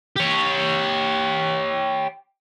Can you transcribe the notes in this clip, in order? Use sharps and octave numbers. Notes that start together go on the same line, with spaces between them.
G4 C#5